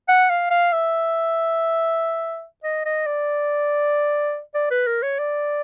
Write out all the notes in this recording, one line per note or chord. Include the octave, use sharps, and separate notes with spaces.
F#5
F5
F5
E5
D#5
D#5
D5
D5
B4
A#4
C#5
D5